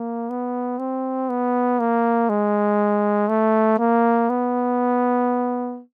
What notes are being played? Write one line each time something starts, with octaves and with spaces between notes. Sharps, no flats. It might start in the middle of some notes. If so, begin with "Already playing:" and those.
Already playing: A#3
B3
C4
B3
A#3
G#3
A3
A#3
B3